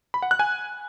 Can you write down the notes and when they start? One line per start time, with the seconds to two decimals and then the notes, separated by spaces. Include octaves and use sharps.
0.14 B5
0.22 F#5
0.31 F#6
0.39 G#5